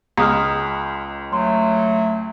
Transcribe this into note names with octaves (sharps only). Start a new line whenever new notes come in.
C#2 G#3 A#5 D#6 F6
F#3 A3 C6